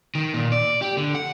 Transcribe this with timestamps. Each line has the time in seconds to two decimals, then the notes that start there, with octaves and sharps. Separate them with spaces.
0.15 D#3
0.34 A#2
0.52 D5
0.82 G4
0.97 D3
1.15 F#5